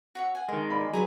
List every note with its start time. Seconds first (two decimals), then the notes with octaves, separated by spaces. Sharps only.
0.15 F#4 C#5 E5
0.35 F#5 G#5
0.49 D#3 G#3 A#4
0.70 D5 B5
0.93 F#3 G#4 B4 G#5 A#5